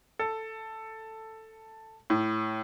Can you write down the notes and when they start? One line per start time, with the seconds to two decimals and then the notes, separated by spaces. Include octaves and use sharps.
0.19 A4
2.10 A2